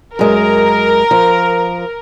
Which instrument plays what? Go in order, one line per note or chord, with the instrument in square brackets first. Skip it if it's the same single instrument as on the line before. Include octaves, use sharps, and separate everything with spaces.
[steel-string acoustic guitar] F#2 G#3 [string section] A#4
[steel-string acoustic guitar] F3